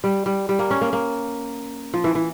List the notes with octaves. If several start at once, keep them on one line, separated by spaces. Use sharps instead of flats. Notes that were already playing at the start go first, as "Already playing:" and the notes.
G3
G3
G3
A#3
C#4
A#3
A#3
F3
E3
E3